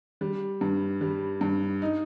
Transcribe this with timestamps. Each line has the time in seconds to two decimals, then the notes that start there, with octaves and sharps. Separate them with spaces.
0.21 G3
0.61 G2
1.01 G3
1.41 G2
1.82 D#4